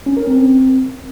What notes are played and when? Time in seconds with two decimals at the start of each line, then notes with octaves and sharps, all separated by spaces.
0.06 C#4
0.17 A#4
0.27 C4